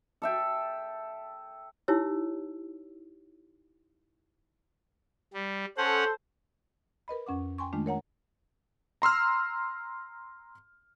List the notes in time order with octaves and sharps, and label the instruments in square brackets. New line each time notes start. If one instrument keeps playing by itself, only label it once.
[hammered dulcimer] A4 E5 G5
[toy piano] D#4 E4 G4 C#5 E6
[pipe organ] G3
[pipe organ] C#4 F#5 [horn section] A4 C5
[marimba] A#4 B4 D#5 B5
F2 C#4 F#5 D6
G5 G#5 C6 C#6
D#3 G#3 A3 D4 F4
A#4 C#5 F#5 A#5
[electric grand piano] A#5 C6 E6 F6